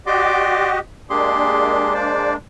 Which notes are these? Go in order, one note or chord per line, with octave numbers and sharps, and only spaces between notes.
F#4 G4 D5 D#5 C6 D6
G#3 A#3 D4 G4 G#4 C6
C5 D5